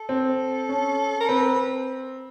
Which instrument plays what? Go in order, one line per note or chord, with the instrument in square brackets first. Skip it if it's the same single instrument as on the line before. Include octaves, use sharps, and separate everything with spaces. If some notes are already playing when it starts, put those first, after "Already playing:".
Already playing: [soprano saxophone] A4
[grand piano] C4
C#4
[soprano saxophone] A#4
[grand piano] C4 [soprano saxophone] B4